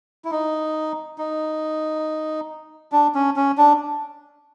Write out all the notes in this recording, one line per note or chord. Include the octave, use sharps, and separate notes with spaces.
E4
D#4
D#4
D4
C#4
C#4
D4